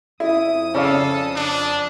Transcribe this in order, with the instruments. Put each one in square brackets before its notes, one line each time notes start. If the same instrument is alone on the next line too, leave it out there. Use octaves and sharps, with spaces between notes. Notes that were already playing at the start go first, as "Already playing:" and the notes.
[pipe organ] F2 D#6 [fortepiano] E4
[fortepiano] C#3 [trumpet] A4 [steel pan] C#5 D5 F5
[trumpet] D4